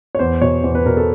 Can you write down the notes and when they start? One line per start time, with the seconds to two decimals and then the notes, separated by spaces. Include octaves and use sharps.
0.15 C#5
0.19 E2 C5
0.42 B2 C#5
0.64 E2 C5
0.75 B4
0.86 B2 A#4
0.97 A4